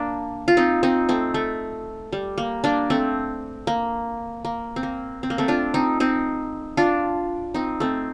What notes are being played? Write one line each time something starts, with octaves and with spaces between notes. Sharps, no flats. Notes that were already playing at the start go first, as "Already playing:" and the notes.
Already playing: A#3 D4
F4
C4 D#4
C4 D#4
A3 C4
A3
G3
A#3
A#3 D4
A3 C4
A#3
A#3
C4
A#3
C4
A#3
A3 C4
D4 F4
C4 D#4
C4 D#4
D4 F4
C4 D#4
A3 C4